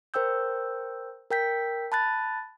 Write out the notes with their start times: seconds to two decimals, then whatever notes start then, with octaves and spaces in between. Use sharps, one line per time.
0.14 A#4 C5 G5 E6 G6
1.31 A#4 G5 G6 B6
1.92 A5 B5 F#6 A6